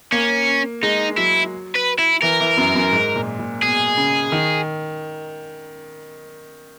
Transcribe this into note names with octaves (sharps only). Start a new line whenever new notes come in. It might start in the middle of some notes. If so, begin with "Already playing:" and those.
A#3 C#4
G#3 D#4
F#3 E4
B4
E4
E3 A#4
E3
F#2
F#2
G#2
A#2
A#2
B2 G#4
C#3
D#3